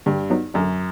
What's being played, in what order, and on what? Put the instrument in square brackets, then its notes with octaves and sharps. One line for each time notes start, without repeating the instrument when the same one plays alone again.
[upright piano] G2 [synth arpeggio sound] D3
[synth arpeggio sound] F#3 B3 D#4
[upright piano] F#2 [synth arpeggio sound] D3